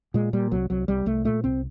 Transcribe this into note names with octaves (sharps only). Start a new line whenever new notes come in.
A#2 G#3
A#2 G3
C2 F#3
C2 F#3
C2 G3
C2 A3
A#2 A3
C2 C4